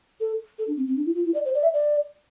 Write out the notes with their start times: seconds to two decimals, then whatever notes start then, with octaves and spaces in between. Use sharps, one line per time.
0.20 A4
0.58 A4
0.67 D4
0.77 C4
0.87 C4
0.96 D4
1.06 E4
1.15 F4
1.25 E4
1.34 D5
1.45 C5
1.55 D5
1.63 E5
1.73 D5